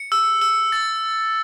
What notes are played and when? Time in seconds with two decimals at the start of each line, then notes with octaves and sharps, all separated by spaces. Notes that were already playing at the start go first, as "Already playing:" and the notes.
Already playing: C#7
0.12 E6
0.41 E6
0.72 A6